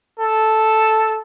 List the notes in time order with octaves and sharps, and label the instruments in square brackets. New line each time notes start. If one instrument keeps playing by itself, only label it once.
[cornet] A4